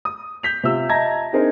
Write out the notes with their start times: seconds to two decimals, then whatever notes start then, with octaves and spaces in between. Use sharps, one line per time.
0.05 D#6
0.43 G6 B6 F7
0.64 C3 F4 E6
0.89 D#5 E5 A5 A#5 G#6 A#6
1.33 C4 D4 D#4 G#4 A#4 C5